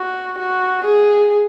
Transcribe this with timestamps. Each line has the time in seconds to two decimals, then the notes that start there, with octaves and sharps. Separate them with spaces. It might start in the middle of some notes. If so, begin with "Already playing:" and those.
Already playing: F#4
0.39 F#4
0.85 G#4